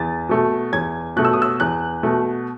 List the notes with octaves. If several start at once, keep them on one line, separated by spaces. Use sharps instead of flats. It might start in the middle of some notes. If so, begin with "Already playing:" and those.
Already playing: E2 A6
B2 A3
E2 G#6
B2 A3 F#6
E6
D#6
E6
E2 F#6
B2 A3